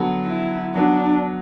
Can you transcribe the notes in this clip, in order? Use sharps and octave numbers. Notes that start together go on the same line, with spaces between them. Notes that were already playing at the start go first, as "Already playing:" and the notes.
Already playing: D3 F#3 B3 F#4 A4
E4
F#3 B3 D4 F#4